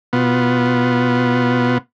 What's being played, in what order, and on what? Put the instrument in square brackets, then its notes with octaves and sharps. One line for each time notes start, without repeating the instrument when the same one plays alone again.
[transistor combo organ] B2 B3 F4